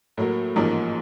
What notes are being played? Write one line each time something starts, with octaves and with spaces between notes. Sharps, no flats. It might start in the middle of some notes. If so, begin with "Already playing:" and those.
A2 F#3 A#3
A1 G#2 F3 A#3